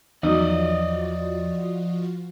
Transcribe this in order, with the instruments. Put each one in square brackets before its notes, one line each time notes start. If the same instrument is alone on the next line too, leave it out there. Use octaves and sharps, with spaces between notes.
[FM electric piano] E2 [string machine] F3 F4 F#4 [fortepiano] F#3 D#4 [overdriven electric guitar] D5 D#5